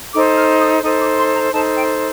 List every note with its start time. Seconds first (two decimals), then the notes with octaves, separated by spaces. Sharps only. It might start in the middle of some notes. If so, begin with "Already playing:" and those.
0.13 D#4 A4 C5 D6
0.37 F6
0.59 D#6
0.83 D#4 A4 C5 D#6
1.00 D6
1.18 C6
1.35 A#5
1.52 D#4 A4 C5 A5
1.75 G5